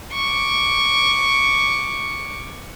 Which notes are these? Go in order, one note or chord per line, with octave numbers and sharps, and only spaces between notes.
C#6 D6